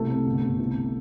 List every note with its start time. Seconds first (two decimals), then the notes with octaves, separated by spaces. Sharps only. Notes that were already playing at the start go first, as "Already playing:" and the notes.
Already playing: C2 A3 A4
0.09 C3
0.26 G1
0.42 G1
0.59 C2